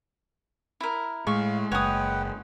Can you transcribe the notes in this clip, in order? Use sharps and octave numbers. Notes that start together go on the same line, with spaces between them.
E4 A#4
A2 G#3 F5 C#6
F#1 B4 C#5 F#5 G5 D#6